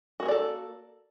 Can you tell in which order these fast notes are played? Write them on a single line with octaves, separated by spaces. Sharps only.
F#4 A#3 G#4 D5 A4